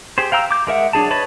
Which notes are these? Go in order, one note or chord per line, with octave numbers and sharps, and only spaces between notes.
G4 G#4 C5
F5 G5 A#5 E6
D6 G6
G#3 A#4 E5 F#5
F#3 D4 G#4 A5
B4 C#5 D#5 A5 B5